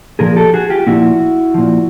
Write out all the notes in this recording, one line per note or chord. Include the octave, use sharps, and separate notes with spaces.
A#2 F3 G#4 A#4
G4 A4
F#4 G#4
F4 G4
A#2 F3 E4 F#4
A#2 F3